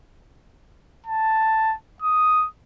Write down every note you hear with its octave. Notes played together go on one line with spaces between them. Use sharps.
A5
D#6